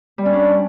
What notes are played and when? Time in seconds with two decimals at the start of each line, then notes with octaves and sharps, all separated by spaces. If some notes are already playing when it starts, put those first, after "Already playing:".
0.18 G3
0.26 C#4
0.33 D4